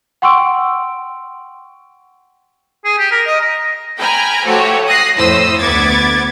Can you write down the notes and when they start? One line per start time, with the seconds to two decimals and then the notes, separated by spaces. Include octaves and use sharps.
0.22 F#5 G5 C6 C#6 E6 D7
2.84 G#4
2.98 G4
3.11 A#4
3.26 D#5
3.40 A#5
3.98 G5 G#5 A#5 B5 F6
4.46 F3 A3 F#4 G4 C#5
4.87 D#6 F#6 A#6 C7
5.16 F2 A2 C5 D#6 E6
5.59 D2 B3 D6 G#6 A6